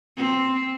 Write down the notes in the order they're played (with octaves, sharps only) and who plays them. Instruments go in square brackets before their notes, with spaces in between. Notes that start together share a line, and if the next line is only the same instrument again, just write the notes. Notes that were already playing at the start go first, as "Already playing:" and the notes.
[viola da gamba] C4